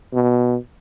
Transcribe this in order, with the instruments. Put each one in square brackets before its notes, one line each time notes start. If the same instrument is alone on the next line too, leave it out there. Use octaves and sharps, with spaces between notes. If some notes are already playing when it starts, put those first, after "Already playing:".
[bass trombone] B2